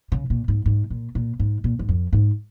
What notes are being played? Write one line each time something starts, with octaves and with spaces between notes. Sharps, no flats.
C#3
A#2
G#2
G#2
A#2
A#2
G#2
A#2
G#2
F2
G#2